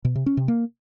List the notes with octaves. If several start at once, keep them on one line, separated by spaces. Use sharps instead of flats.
B2
C3
C#4
C3
A#3